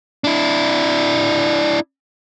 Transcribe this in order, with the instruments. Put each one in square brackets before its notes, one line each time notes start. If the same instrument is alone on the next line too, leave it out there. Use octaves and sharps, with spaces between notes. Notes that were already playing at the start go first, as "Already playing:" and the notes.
[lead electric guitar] D4 E4